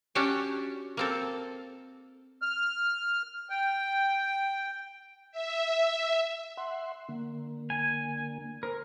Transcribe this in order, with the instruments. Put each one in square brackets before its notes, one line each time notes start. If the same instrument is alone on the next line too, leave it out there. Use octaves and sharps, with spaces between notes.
[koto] C#4 D4 F#4 G4 F#5 G5
A#3 C4 A4
[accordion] F6
G5
[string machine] E5
[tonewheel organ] E5 F#5 C6
D3 A#3
[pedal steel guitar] G#5
[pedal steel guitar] A#4 [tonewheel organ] C5